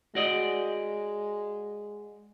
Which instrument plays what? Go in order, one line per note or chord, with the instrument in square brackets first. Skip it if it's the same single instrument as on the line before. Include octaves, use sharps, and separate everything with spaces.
[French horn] G#3 [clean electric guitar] F#4 D5 D#5